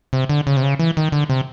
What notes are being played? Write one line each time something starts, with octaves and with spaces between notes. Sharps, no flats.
C3
D3
C#3
C3
C#3
E3
D#3
D3
C3